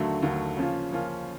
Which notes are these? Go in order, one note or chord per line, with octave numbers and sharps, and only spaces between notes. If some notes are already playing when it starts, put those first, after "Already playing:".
Already playing: D#2 D3 F#3 A3
D#2 D3 F#3 A3
C#3 F3 A#3 C#4 F4
C#3 F3 A#3 C#4 F4